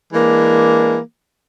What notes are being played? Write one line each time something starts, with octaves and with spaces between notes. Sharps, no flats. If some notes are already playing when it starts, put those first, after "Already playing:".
E3 G#3 A#3 D4